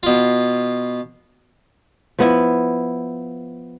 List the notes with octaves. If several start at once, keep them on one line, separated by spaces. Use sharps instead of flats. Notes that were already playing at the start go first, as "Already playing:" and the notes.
B2 F4
F3 B3 E4